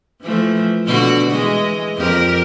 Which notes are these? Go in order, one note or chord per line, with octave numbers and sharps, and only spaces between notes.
E3 F3 A3
B2 D3 F#4
E3 G#3 D#5
F2 G4 A#4